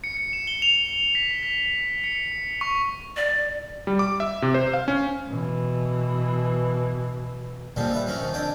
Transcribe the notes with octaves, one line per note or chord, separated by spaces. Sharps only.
C#7
C#7
E7
G7
F7
B6
B6
C#7
C#6
D5
G3
D6
E5
C3
C5
F5
C#4
B2 E3
A#2 D3 F3 G3 C4 F4
G3 B4 E5
F3 C4 C#4 F#4 A#4
D#3 F3
F2 D3 D4 G5 G#5 D#6